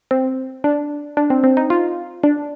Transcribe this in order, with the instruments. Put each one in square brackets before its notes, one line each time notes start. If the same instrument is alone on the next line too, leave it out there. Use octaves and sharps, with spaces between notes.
[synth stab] C4
D4
D4
C4
C4
D#4
F4
D4